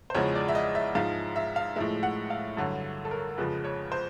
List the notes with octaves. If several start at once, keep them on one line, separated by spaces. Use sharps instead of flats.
C5
E2 C#3 F3 G#3 C#5
D5
E5
D#5
E5
G#2 F3 G#3 F5
E5
F5
A2 F3 G#3 E5
F#5
F5
G2 D3 F#3
A4
A#4
F2 C#3 F3 G#3 B4
C#5
C5